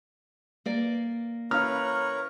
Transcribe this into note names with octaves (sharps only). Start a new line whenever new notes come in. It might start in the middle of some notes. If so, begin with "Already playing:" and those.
A#3 D5
C#4 E4 A#4 B4 C#5 F5 F6